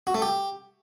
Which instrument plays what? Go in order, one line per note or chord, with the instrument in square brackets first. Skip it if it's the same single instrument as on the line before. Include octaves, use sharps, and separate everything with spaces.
[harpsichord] F#4
A3
G4